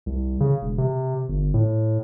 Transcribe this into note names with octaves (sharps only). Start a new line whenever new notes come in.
C2
C#3
E1
C3
G1
A2